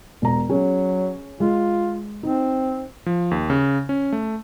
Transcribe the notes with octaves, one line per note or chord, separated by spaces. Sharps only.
E1 A#5
F#3 C#4 G#4
G#3 F4
C4 D#4
F3
D#2
C#3
C#4
A3